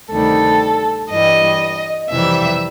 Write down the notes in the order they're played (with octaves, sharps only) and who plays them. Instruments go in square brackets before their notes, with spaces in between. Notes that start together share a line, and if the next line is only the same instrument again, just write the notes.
[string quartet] D2 C3 D#3 G3 A4
G2 E3 G3 D#5
F2 C3 E3 G3 E5